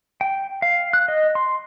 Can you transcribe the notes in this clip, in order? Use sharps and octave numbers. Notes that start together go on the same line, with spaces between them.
G5
F5
F#6
D#5
C6